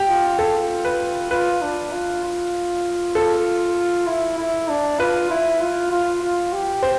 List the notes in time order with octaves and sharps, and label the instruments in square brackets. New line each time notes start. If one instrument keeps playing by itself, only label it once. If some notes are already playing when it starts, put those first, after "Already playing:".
Already playing: [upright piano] G4
[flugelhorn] F4
[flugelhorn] F4 [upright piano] A4
[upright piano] B4
[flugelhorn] F4 [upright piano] B4
[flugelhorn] D4
F4
F4
[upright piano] A4
[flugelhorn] E4
E4
D4
[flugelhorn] F4 [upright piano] B4
[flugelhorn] E4
F4
F4
F4
G4
[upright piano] C5